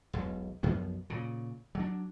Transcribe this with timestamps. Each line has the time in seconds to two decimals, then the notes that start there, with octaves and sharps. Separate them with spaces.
0.13 E1 B1
0.63 B1 F#2 F3 B3
1.10 A#2 C#3
1.75 F#3 D4